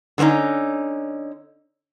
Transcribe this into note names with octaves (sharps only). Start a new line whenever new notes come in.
D3 A#3 C4 C#4 D#4